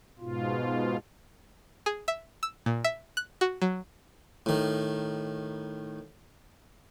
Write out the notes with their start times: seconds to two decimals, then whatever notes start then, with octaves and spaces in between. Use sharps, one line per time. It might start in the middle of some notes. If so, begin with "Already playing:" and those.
0.19 G#2 B2 F4
1.86 G#4
2.08 E5
2.43 E6
2.66 A#2
2.84 E5
3.17 F#6
3.41 F#4
3.62 F#3
4.46 A2 D#3